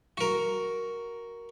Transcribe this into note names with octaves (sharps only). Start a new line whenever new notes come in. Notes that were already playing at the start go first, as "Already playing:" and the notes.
F#4 A#4